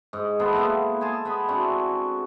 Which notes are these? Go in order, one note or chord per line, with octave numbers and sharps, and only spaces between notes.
G#2
B3 E4 A4 C5
A#3 B3 E4
G#4 C5 G#5 A5
B3 B5
C4 D4 E4 F#4